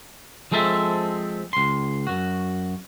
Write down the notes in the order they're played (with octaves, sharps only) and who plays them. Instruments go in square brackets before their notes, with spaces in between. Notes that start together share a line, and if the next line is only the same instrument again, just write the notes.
[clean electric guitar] F3 G#3 C4 A4 E5 A5
C#2 C6
F#2 F#4